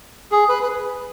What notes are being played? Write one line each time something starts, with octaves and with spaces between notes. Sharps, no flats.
G#4
B4
B4